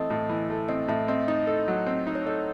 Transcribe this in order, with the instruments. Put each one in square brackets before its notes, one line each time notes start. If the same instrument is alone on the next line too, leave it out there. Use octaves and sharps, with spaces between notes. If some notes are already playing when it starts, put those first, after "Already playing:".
Already playing: [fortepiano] E3 A3 C4 [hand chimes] D#5
[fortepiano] A2
E3
A3
[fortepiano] C4 [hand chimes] D#5
[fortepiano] A2 [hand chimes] E5
[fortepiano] C4 [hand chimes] D#5
[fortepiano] D#4 [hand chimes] D#5
[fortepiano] A4
F#3
C4
D#4
[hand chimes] C#5
[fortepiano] A4 [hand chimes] D#5